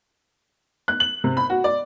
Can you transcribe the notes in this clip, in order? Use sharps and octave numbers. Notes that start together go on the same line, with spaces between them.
F#6
F#7
C3
B5
F#4
D5